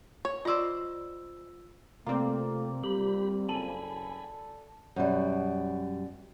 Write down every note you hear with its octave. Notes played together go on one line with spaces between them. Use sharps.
C#5
F4 C5 D5 D#5 E6
C3 A3 A#3 C4 F4 D5
G3 G4 B5
F#1 A4 G#5 B5
F#2 B2 G3